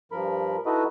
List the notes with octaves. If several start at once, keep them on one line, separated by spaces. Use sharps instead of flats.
G2 F3 A#4 B5
D#4 E4 F#4 A4 B4 D#5